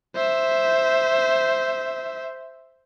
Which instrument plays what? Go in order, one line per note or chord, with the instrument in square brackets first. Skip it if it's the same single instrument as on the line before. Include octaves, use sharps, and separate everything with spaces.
[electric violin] C5 E5